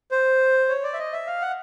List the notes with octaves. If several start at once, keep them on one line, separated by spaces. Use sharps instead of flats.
C5
C#5
D5
E5
D#5
E5
F5
F#5